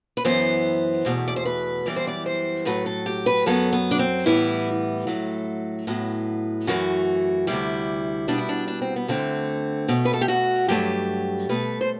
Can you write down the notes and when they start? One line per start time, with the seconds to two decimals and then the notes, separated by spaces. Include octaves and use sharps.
0.17 B4
0.25 F#2 E3 B3 C5
1.05 E2 B2 A3
1.28 D5
1.36 C5
1.45 B4
1.86 F#2 E3 G3 B3 D5
1.96 C5
2.07 D5
2.26 C5
2.65 A2 F#3 A3 B4
2.86 A4
3.06 G4
3.26 B4
3.46 F#2 F#3 B3 A4
3.73 B3
3.91 D4
3.99 C4
4.26 A2 E3 G3 B3 E4
5.07 A2 F#3 A3
5.87 A2 F#3 B3
6.67 F#2 E3 A3 F#4
7.47 D2 C3 G3 E4
8.28 B2 G3 B3 D4
8.38 E4
8.49 D4
8.68 D4
8.82 C4
8.96 B3
9.08 D2 D3 A3 C4
9.88 B2 A3
10.05 B4
10.13 A4
10.21 G4
10.28 F#4
10.68 G2 F#3 A3 G4
11.49 B2 A3 B4
11.81 C5